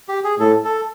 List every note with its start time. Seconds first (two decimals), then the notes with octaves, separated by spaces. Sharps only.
0.09 G4
0.24 G#4
0.39 A2 A4
0.65 A4